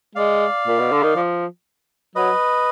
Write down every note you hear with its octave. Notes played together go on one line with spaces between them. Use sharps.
G#3 D5 F5
A#2
B2
D3
D#3
F3
F#3 B4 D#5